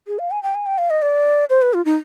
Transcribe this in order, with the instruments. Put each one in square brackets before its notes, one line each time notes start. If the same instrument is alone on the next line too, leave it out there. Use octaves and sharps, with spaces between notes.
[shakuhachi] G#4
F5
G#5
G5
G#5
G5
F5
D#5
D5
C5
B4
F4
D#4